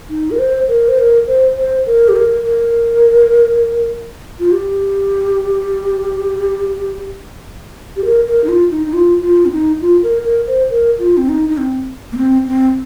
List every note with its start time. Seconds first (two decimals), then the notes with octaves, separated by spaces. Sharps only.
0.10 D#4
0.31 A#4
0.39 C5
0.68 A#4
0.89 C5
0.98 A#4
1.27 C5
1.57 C5
1.86 A#4
2.09 G4
2.16 A#4
2.45 A#4
4.40 F4
4.52 G4
7.96 G4
8.05 A#4
8.27 A#4
8.44 D#4
8.49 F4
8.71 D#4
8.87 D#4
8.93 F4
9.22 F4
9.46 C4
9.52 D#4
9.81 F4
10.03 A#4
10.26 A#4
10.47 C5
10.70 A#4
10.99 F4
11.17 C4
11.29 D#4
11.49 D#4
11.58 C4
12.12 A#3
12.17 C4
12.47 C4